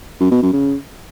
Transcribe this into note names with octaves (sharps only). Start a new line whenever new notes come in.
F#2
B2
F#2
C#3